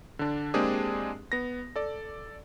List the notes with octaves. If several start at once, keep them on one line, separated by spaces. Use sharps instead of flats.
D3 D4
G#3 A#3 C4 D4 G4 G#4
B3 A#6
A4 D5